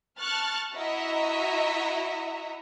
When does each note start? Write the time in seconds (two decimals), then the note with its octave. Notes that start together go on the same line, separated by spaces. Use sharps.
0.18 A5 C#6 F6 F#6 A6
0.75 E4 F#4 D#5 E5 A#5